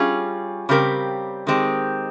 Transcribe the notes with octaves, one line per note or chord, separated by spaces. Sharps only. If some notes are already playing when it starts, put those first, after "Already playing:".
Already playing: G3 C#4 F4 G#4
C#3 G3 C4 G4 A#4
D#3 G#3 C4 G4